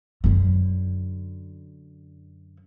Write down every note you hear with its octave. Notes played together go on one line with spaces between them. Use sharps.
F#2 D3